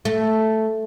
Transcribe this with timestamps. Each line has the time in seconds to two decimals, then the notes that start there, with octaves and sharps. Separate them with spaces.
0.05 A3